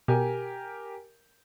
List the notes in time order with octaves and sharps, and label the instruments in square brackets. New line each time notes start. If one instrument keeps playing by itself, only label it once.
[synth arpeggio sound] B2 [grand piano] G4 A#4 G#5